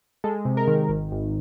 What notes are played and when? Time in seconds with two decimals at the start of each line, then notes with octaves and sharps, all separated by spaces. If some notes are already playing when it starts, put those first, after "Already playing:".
0.24 G#3 A4
0.45 C3
0.57 A#4
0.68 D#3
0.89 G#1
1.12 G#1